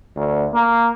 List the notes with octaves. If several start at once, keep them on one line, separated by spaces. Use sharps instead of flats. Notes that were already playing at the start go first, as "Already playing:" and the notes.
D2
A#3